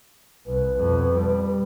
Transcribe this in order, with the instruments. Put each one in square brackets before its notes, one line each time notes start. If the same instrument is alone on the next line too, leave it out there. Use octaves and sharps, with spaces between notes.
[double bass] C2 [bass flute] B4
[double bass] F2 B2
G3